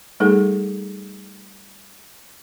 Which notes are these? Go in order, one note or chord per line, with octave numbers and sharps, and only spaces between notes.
G3 A3 D#4 G#4 A4